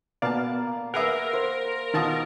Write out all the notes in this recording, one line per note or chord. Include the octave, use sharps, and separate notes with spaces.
B2 A#3 B3 D5 F5 A5
G#4 A#4 B4 E5 F#5
C5
B2 D#3 F4 A5 D#6